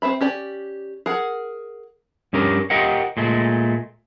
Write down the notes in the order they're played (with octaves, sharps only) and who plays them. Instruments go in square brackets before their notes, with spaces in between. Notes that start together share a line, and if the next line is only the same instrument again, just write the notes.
[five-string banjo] C4 C5 E5 B5
C#4 G4 D5
G#4 A#4 F#5
[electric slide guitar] G2 C#4 G4 A#4
G4 A#4 D#5 F5 F#5
A#2 G#3 A3